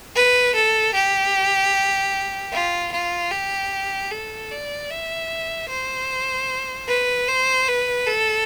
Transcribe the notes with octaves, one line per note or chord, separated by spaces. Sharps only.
B4
A4
G4
F4
F4
G4
A4
D5
E5
C5
B4
C5
B4
A4